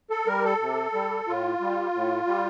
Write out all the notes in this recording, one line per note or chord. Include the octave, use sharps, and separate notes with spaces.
A4
G3 A#4
A4
C3
G3
A2 F4
G3
A2
G3